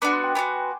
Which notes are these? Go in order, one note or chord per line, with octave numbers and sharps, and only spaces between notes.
B3 D4 F#4 D6
C6
G5
B3 D4 F#4 G#5